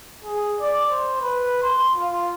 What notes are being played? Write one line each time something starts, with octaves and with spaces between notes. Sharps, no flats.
G#4
D5
C5
B4
C6
F4